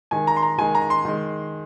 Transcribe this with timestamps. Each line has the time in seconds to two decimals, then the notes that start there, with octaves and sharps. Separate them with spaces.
0.11 D#3 G#3 G#5
0.27 A#5
0.37 C6
0.43 A#5
0.58 D#3 G#3 G#5
0.75 A#5
0.90 C6
1.05 D#3 G#3